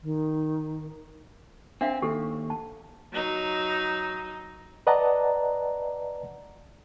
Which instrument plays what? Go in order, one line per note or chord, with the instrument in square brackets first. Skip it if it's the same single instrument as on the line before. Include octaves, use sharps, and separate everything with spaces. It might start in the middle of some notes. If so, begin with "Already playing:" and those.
[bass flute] D#3
[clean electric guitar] C4 [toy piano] D4 E5 F5
[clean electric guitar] D#2 [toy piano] G4 A4
[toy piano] A5
[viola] F#3 D#4
[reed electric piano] B4 D5 D#5 F#5 A5 A#5